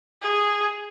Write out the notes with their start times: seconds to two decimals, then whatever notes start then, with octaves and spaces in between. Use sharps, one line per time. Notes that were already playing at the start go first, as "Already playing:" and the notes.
0.22 G#4